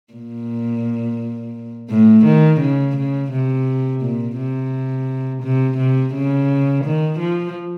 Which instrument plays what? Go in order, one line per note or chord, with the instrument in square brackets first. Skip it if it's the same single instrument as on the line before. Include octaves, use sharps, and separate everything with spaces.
[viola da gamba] A#2
A2
D#3
C#3
C#3
C3
A#2
C3
C3
C3
C#3
D#3
F3